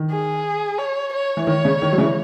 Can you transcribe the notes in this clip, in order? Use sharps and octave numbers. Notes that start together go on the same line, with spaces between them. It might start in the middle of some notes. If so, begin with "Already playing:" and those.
Already playing: D#3
G#4
C#5
C#5
E3
D#3 C#5
C#3
D#3
F#3
C#3 E3